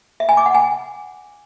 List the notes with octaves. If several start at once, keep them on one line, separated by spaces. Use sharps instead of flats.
E5
G#5
D6
F#5
G#5